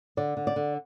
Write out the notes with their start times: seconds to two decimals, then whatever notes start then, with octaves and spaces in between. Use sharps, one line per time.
0.17 D3 D5
0.37 D3
0.47 D5
0.56 D3